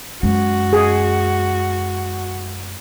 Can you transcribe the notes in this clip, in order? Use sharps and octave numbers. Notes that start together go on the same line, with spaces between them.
F#2 G#3 F#4
G#4